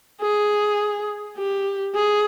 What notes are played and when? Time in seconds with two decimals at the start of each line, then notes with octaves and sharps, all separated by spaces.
0.21 G#4
1.37 G4
1.95 G#4